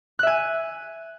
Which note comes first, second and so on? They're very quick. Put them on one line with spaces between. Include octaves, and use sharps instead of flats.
F#6 E5 G#5